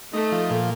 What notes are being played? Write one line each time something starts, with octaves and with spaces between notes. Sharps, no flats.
A3 D#4
F3
A#2